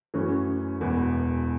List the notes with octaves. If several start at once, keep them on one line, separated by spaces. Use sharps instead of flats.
F#2 E3 A3 C#4
E1 E2 E3